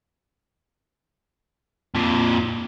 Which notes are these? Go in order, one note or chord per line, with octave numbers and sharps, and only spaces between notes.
F2 A#2